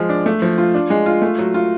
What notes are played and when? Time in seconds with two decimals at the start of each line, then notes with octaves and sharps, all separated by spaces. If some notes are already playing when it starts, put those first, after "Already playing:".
Already playing: F3 G#3
0.09 D4
0.26 A3
0.42 F3
0.58 F4
0.74 D4
0.90 G#3
1.06 F4
1.22 A3
1.39 F#3
1.54 F4